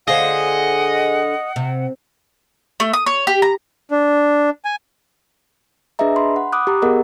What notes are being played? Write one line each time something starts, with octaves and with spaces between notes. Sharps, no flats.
D3 F4 G#4 C5 D#5 F#5
C3
A3
D#6
C#5
G4
A#5
D4
G#5
D4 G#4 B4 D#5 E5 A#5
B5 C6
F#5
B5 D6 D#6 F#6
G4 A#5
B3 G#4 A#4 D#5 F#5 A#5